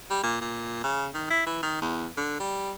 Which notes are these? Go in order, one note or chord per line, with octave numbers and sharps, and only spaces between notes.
G3
A#2
A#2
C#3
D#3
E4
E3
D#3
E2
D3
G3